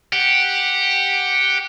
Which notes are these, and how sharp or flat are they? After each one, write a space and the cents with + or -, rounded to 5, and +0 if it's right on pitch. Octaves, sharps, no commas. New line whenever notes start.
G4 +0 F#5 -5